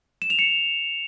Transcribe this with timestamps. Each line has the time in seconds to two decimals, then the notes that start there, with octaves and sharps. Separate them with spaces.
0.22 E7
0.30 F7
0.39 C#7